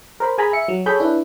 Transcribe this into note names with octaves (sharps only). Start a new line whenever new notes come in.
A#4 C5 B5
G#4 G#5 A#5 B5
E5 C#7
F#3
G#4 A4 C#5 G#5 B5 G6
D4 E4 B4